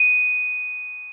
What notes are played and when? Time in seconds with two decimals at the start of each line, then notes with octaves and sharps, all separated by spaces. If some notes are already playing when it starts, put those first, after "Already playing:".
Already playing: D#7